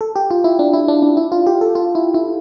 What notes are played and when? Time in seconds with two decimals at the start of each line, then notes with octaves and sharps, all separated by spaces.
0.01 A4
0.16 G4
0.31 F4
0.44 E4
0.59 D4
0.73 E4
0.88 D4
1.03 D4
1.17 E4
1.32 F4
1.47 G4
1.61 A4
1.75 F4
1.95 E4
2.14 E4